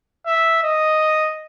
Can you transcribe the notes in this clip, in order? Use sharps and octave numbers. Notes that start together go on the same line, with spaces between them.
E5
D#5